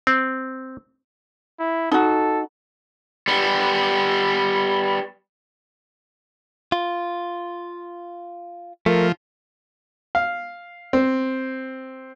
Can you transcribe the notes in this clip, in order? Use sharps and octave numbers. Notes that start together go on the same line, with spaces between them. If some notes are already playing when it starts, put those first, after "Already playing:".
C4
E4
D#4 F#4 A4
G3 B3
F4
F3 A3 A#4
F5
C4